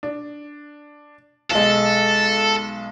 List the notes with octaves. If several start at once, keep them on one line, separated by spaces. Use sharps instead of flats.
D4
B1 G#3 A4